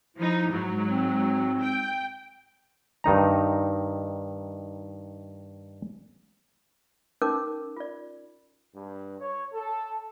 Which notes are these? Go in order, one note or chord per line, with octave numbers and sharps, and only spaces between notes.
F3 D#4 E4
G#2 F#3
C4
G5
G2 D#3 D#4 A#5
C#4 D#4 A#4 D6
F4 D5
G2
C#5
A4